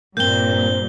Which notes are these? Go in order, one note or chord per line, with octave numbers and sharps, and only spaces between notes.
G2 A#2 A#3 C4 G6 G7